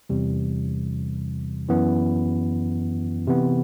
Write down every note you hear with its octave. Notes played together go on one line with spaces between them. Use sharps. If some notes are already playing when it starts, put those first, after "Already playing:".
E2 C3 E3 G3
F#2 E3 B3 E4
C3 E3 B3